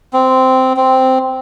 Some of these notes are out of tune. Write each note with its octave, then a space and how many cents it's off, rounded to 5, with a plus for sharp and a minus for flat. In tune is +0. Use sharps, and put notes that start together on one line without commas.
C4 -10
C4 -5